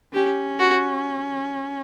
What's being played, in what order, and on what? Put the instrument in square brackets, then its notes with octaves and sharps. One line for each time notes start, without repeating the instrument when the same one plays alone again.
[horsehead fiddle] C#4 [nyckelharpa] G4
[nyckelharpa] F#4